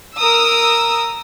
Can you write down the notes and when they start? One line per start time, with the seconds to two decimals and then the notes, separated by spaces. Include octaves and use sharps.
0.16 A#4 D#6 E6